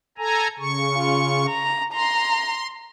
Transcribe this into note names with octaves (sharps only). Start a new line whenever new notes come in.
A4 G#5 A#5
C#3 C#6
F4
A#5
A#5 C6